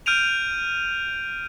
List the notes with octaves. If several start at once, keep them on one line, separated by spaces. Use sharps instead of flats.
F6 G6 D7 D#7 F7